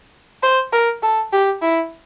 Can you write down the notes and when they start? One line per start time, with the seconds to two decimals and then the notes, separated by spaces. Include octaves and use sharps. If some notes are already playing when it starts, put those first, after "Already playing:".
0.43 C5
0.73 A#4
1.03 A4
1.33 G4
1.62 E4